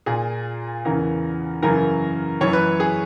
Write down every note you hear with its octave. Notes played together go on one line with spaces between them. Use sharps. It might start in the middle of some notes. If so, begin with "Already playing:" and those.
A#2 G#4
E2 C#3 E3 A#4
F#2 C#3 E3 A#4
F#2 E3 C#5
B4
G#4